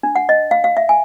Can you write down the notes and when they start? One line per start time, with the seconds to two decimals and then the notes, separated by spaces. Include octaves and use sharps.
0.03 D4
0.16 F#5
0.29 D#5
0.51 F5
0.64 F5
0.77 E5
0.89 G#5